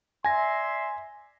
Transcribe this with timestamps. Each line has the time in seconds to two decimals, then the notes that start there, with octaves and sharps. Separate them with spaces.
0.24 D5 E5 G#5 C6 A#6